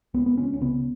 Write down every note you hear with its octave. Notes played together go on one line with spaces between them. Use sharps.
C#2 B3
B3
C#2 C#4
C#4
C#3 B3